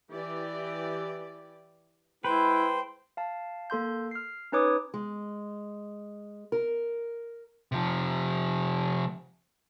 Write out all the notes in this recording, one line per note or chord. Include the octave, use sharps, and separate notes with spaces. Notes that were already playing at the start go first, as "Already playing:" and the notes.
E3 G4 D5
G#3 E4 B4 C5 G5
F5 A5
A#3 A4 C6 G6
F6 C7
C#4 D#4 B4 C#5 D6 D#6
G#3
A#4
C3 F3